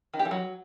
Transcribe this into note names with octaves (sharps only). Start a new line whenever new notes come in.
D#3
G4
E3
F#3